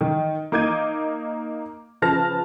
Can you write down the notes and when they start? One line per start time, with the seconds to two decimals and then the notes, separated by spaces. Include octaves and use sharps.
0.01 D#3
0.52 A#3 D#4 D6 G6 G#6 D#7
2.02 C#3 F3 B4 A5 F6 A#6